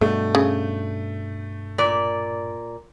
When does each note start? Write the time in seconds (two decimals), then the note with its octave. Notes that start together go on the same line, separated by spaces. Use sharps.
0.01 G2 B2 A3
0.35 C#3
1.78 A#2 D5